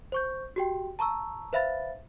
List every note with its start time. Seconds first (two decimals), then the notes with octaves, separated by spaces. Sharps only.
0.12 C5 C#6 G6
0.56 F#4 G4 G5
0.99 A5 A#5 C#6 E6
1.53 B4 C5 E5 F5 B5 A6